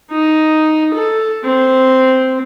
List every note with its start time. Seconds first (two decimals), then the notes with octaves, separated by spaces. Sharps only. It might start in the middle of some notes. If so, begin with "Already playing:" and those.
0.12 D#4
0.95 A4
1.45 C4